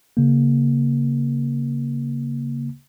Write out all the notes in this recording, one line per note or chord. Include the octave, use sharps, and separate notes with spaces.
C#3 A#3